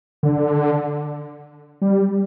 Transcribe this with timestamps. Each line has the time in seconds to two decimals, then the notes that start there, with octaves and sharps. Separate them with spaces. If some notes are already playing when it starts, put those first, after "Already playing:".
0.23 D3
1.82 G3